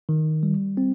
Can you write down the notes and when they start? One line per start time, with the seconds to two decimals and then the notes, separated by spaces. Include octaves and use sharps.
0.09 D#3
0.43 G3
0.77 C4